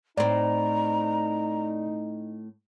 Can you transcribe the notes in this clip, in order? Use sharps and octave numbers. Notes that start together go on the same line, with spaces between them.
A2 C4 D#4 D5 A#5